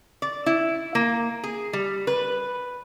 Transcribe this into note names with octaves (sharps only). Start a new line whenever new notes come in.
D5
E4
A#3
G#4
G3
B4